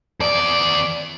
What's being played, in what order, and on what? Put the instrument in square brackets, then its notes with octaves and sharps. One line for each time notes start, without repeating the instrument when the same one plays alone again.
[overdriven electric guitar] E2 D5